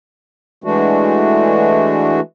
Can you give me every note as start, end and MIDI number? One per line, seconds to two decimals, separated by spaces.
0.64 2.20 52
0.64 2.20 56
0.64 2.20 57
0.64 2.20 62
0.64 2.20 66